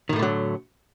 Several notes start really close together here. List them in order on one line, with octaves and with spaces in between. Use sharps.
D#3 A2 A3 D3 F#3